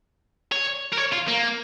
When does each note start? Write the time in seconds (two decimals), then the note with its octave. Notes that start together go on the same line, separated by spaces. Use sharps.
0.52 C#5
0.92 A#4
0.97 C#5
1.12 F4
1.28 A#3